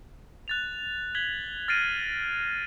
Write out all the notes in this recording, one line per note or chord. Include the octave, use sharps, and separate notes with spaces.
F#6 A6 F7
G#6 B6 F#7 G7
F6 A6 A#6 C7 D7 D#7